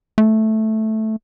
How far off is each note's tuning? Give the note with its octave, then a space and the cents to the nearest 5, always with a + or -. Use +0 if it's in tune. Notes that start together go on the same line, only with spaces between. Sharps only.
A3 -5